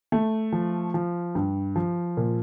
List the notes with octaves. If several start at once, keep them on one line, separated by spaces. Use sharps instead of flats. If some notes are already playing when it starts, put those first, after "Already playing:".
A3
F3
F3
G2
F3
A#2